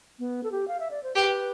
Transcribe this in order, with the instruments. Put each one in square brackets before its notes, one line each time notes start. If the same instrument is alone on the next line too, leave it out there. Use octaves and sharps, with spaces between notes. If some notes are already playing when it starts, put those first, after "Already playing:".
[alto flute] B3
A4
G4
F5
E5
D5
C5
[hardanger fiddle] G4 [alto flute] B4